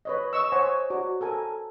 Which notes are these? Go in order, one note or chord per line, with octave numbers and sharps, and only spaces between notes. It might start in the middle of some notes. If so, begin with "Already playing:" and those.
B4 C#5 D#5
D#5 C#6 E6
C5 C#5 D#5 F#5 G#5
F#4 D5
A4 A#4 G#5